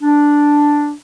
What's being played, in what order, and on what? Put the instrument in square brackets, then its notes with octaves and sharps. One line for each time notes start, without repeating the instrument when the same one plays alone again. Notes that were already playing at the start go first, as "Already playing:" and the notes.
[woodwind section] D4